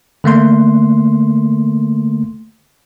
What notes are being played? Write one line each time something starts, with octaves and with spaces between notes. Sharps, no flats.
D3 A3 A#3 C6